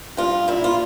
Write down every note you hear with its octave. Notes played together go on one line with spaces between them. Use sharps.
G2 F4
A#2 E4
F4